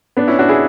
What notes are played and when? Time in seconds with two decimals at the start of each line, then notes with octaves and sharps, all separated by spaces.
0.17 B3 D4
0.28 C#4 E4
0.39 D4 F#4
0.49 E4 G#4